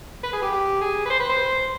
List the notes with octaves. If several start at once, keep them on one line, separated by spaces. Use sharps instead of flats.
B4
G#4
G4
G4
G#4
B4
C5
B4
C5